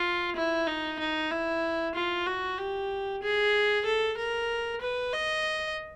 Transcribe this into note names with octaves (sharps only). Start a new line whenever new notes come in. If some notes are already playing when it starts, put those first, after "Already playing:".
Already playing: F4
E4
D#4
D#4
E4
F4
F#4
G4
G#4
A4
A#4
B4
D#5